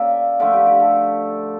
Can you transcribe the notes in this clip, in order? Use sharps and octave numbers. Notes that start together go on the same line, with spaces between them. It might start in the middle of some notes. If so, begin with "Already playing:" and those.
Already playing: C#3 A#3 D5 E5
D3 F3 A3 E5
G4
G4
A4